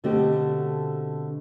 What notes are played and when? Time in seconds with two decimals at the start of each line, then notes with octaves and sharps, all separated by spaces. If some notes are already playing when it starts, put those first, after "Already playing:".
0.04 B2 D3 A3 C4 F#4 G4